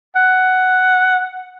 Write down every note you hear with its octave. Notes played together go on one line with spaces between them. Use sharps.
F#5